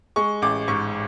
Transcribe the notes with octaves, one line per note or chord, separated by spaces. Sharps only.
G#3 C#6
A1 D6
G#2 C#6